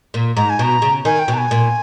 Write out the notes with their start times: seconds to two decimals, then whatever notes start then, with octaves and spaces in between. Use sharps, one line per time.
0.14 A#2
0.36 G#2 A#5
0.49 G#5
0.59 B2 A#5
0.82 C#3
1.05 D#3 G#5
1.19 G5
1.28 B2
1.34 A#5
1.38 G#5
1.51 A#2